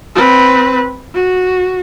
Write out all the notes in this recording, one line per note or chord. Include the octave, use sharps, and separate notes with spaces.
C4 B4
F#4